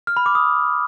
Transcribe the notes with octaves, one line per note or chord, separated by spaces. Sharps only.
F6
B5
D6
D#6